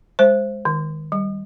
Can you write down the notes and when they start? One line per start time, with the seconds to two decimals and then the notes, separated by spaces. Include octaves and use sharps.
0.19 G#3 C5
0.65 D#3
1.12 G3